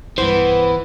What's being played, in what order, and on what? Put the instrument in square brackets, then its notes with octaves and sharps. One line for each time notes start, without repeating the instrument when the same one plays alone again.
[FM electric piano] B1 G2 [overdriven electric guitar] E3 [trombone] B3 [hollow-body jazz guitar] C5